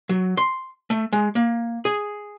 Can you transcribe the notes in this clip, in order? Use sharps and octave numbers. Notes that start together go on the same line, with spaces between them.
F#3
C6
A3
G#3
A#3
G#4